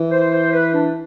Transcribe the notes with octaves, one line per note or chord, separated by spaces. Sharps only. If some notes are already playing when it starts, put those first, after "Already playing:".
Already playing: E3
C5
C5
B4
D4